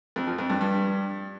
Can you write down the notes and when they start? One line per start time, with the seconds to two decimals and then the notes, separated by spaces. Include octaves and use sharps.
0.16 F2
0.27 F3
0.38 F2
0.50 G2
0.61 G2